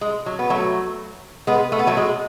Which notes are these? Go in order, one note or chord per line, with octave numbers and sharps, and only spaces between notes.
G#3
F#3
B3
F#3 A3
G#3 B3
A3
B3
F#3 A3
G#3